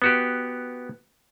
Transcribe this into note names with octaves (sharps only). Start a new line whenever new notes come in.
B3 F#4 G4